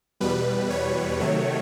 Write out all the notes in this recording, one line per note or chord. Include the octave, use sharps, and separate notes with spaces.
E2 B2 G3 B4
C#5
C3 D#3 F#3 A3